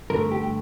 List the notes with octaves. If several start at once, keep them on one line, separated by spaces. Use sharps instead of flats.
G2 D3 A3 A#4
G4